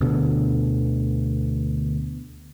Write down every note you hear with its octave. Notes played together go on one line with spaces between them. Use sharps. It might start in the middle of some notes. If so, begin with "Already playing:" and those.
D2 B2 D3